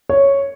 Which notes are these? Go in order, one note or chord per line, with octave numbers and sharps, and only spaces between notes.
C#5